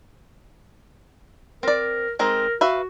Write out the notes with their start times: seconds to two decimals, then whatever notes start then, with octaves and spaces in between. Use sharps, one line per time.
1.63 C4 A#4 D5
2.19 G#3 C4 D#4 A#4
2.61 F#4 B4 E5 F5